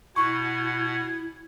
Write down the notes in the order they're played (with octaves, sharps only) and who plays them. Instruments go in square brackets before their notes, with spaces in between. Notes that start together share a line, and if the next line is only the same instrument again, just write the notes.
[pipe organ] B2 F#5 [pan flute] E4 [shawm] G#5 [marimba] C#6